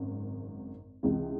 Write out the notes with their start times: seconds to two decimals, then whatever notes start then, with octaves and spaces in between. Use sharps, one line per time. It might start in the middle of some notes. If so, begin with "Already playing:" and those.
Already playing: G#1 F#2 C#3
1.03 C#2 C3 E3 G#3